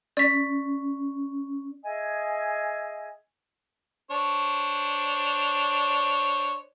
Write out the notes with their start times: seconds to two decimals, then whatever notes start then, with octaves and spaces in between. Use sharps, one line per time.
0.17 C#4 D5 B6
1.83 G#4 D#5 E5 G#5
4.11 D4 C5 C#5